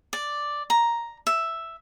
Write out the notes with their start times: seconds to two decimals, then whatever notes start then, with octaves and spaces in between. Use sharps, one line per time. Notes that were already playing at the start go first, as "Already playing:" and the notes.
0.13 D5
0.70 A#5
1.27 E5